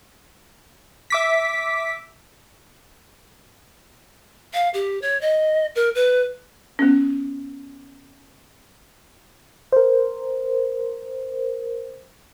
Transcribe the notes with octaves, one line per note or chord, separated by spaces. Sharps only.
E5 D6 B6
F5
G4
C#5
D#5
A#4
B4
B3 C#4
A#4 C5